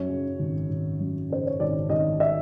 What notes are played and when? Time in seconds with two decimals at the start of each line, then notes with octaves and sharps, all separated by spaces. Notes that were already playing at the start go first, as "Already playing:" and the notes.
Already playing: F#2 C#5
0.09 C#3
0.40 G#1
0.70 G#1
1.00 F#2
1.29 C#3 C5
1.47 C#5
1.60 G#1 D5
1.90 G#1 D#5
2.20 E5